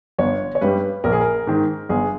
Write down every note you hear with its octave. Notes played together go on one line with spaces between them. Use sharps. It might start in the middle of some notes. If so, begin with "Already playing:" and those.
G1 C#5
C#5
G2 G3 B4
A#1 A#4
G#4
A#4
G#2 D#3
G1 G#4